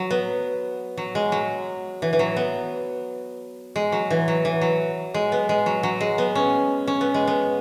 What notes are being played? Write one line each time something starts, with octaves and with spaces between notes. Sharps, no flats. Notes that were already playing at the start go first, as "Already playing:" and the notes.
Already playing: F#3
B3
F#3
G#3
F#3
E3
E3
F#3
B3
G#3
F#3
E3
F#3
E3
F#3
G#3
B3
G#3
F#3
F#3
G#3
B3
C#4
C#4
B3
G#3
B3